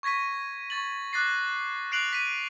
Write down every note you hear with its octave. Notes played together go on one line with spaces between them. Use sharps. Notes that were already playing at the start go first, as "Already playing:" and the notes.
C#6 G#6 A#6 B6 D#7
C#6 A6 F#7
D6 F#6 A6 A#6 C7
F#6 C7 D7 F7 F#7
B6 D#7